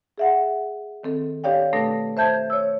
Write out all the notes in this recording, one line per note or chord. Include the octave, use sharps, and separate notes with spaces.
G#4 E5 F#5
D#3 C4 A4
D4 G4 C#5 D5 F5 G5
B2 A3 D4 A4 A#6
C5 E5 A5 G6 G#6
C#5 E6